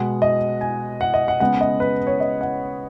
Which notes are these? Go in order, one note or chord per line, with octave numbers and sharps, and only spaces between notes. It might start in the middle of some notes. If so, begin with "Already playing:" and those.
Already playing: B2 G#3 B3 F#5
D#5
G#5
F#5
D#5
F#5
C#3 G#3 B3 F#5
D#5
B4
C#5
D#5
F#5